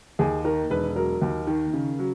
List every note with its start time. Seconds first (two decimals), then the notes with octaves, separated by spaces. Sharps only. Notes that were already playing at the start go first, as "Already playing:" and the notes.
0.19 D#2 G#4
0.45 D#3 A#4
0.70 E1 B4
0.96 F#3 A#4
1.21 D#2
1.47 D#3
1.73 C#3
1.99 F#3